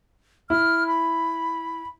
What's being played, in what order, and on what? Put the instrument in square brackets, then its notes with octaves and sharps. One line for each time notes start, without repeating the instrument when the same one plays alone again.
[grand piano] E4 [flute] F6
[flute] B5